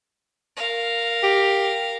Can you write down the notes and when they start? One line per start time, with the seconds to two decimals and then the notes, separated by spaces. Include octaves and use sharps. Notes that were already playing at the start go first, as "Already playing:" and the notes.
0.56 A#4 F5
1.23 G4